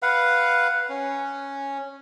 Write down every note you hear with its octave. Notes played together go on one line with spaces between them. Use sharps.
B4 F5 F#5
C#4